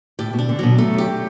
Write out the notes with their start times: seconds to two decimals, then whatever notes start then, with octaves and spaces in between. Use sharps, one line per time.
0.19 A2 G4
0.33 B2
0.39 D4
0.49 D3
0.59 B2 F#3
0.78 A2 A3
0.94 F#2 G4